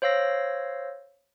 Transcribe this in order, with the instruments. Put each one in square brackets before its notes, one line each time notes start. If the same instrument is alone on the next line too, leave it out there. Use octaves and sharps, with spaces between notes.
[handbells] C5 C#5 F5 E6 A#6